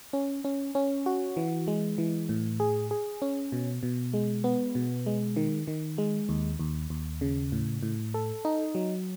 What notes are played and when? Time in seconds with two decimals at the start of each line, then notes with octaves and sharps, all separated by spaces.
0.13 C#4
0.44 C#4
0.75 C#4
1.06 F#4
1.37 E3
1.67 G#3
1.98 E3
2.29 A2
2.60 G#4
2.91 G#4
3.22 C#4
3.52 B2
3.83 B2
4.14 G#3
4.44 B3
4.75 B2
5.06 G#3
5.36 D#3
5.67 D#3
5.98 G#3
6.29 D#2
6.59 D#2
6.90 D#2
7.21 C#3
7.52 A2
7.83 A2
8.14 A4
8.45 D#4
8.75 F#3